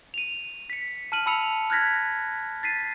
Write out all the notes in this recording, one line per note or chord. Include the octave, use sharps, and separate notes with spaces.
D#7 F7
B6 C#7
A5 F6 D#7 F#7
A5 B5 E6 C#7 F7
F6 F#6 G#6 A#6 B6
A6 B6 C7 D#7